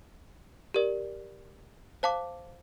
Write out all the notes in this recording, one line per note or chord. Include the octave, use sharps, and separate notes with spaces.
G4 A#4 D5
C5 F5 A5 D6